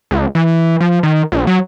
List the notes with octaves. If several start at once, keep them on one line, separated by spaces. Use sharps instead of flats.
C#2
E3
F3
D#3
A#1
F#3